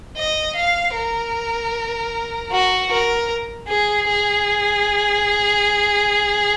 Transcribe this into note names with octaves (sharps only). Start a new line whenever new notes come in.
D#5
F5
A#4
F#4
A#4
G#4
G#4